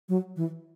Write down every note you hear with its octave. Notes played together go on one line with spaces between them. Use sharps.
F#3
E3